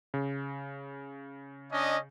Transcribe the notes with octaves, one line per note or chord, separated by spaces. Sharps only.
C#3
C#4 D4 D#5